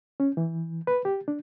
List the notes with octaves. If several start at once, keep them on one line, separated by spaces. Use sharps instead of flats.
C#4
E3
B4
G4
D4